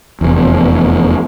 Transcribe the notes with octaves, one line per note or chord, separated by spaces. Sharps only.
F1 E2